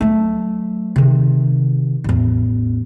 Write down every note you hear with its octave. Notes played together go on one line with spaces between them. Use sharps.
F#3 A3
C3 D#3
A1 E2